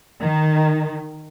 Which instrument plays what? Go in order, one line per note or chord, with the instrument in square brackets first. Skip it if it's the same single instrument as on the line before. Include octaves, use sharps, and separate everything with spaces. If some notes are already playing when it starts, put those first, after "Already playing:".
[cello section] D#3